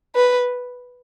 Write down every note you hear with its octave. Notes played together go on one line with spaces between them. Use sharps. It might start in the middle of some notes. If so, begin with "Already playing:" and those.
B4